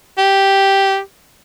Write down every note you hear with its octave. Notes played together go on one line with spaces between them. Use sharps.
G4